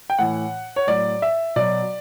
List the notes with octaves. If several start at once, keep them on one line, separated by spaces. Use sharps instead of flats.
G5
A2 E3 F#5
C#5
A2 F#3 D5
E5
B2 F#3 D5